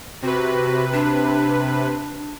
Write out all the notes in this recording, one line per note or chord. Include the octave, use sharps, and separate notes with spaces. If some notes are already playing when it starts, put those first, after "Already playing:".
C3 F#4 B4
D4